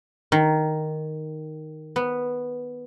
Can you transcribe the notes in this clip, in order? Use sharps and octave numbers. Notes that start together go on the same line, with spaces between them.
D#3
B3